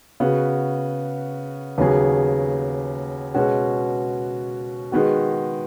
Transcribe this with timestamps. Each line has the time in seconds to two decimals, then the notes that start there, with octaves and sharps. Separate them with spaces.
0.20 C#3 B3 F#4
1.78 D#2 C#3 F#3 B3 G#4
3.34 B2 G#3 C#4 F#4
4.92 D#3 G#3 B3 F#4